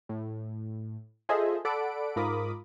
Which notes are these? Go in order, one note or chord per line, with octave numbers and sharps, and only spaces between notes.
A2
F4 G#4 A4 C5 D#5 E5
A4 D5 F#5 B5 D7
G#2 F4 A#4 B5 D6 D#6